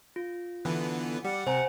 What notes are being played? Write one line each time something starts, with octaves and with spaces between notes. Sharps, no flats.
F4
D3 E3 B3
G3 F#5
C3 C5 G#5 A#5